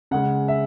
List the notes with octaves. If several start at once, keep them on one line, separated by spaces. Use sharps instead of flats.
C#3 G#3 F#5
E5